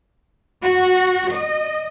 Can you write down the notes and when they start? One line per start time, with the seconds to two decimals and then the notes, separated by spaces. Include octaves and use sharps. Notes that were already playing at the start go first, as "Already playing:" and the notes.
0.62 F#4
1.34 D#5